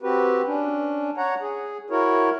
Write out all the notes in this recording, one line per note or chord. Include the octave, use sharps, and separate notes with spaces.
C4 F#4 G4 B4
C#4 D4
C#5 F#5 A#5
G#4
E4 F#4 A#4 C#5